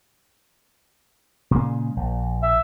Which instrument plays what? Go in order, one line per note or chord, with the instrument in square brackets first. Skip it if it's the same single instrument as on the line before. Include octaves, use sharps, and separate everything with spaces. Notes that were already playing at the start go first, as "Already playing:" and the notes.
[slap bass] A#2 C#3 G#3
A#1
[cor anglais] E5